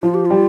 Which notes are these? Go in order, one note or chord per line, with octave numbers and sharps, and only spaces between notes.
F3 F4
G4
G3 F4